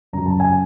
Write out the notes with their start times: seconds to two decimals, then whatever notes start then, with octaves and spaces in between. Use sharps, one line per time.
0.13 F#2 C#3 F#3 A#5
0.26 A5
0.40 G#5